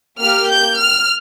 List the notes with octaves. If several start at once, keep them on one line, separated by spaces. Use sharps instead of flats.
A#3 G4 F6
G6
F6